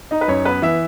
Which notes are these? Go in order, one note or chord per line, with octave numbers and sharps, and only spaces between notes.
D#4 D#5
B4
F#2 C#5
B3 B4
E3 E5